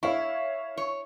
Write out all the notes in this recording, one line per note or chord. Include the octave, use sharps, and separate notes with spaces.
E4 C#5 F5 C#6
C#5